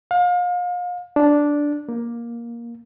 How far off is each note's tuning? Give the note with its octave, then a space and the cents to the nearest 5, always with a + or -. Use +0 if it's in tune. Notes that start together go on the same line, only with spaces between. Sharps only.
F5 +35
D4 -5
A#3 +10